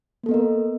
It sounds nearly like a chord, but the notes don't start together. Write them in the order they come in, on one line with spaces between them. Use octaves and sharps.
A#3 A4 B3 D#5 A#4